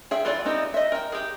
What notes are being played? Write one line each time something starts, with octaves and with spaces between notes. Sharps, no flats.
G#4 E5 G5
E3 F4 A4 D5
B3 C4 D#4 G4
D#5 E5
A#4 G5
G4 G#4